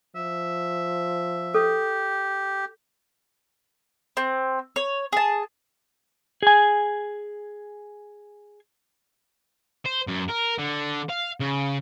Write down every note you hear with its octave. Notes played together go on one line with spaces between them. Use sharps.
F3 E5
G4 A4
C4
C#5
G#4 A5
G#4 G#5
C5
F#2
A#4
D3
F5
C#3